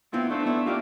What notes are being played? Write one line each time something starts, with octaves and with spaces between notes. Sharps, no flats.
B3 C4 E4 F4
A3 D4 C5
B3 D4 E4
A#3 F4 G4 D5